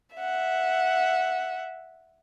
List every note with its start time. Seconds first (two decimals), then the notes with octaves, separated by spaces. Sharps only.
0.16 E5 F#5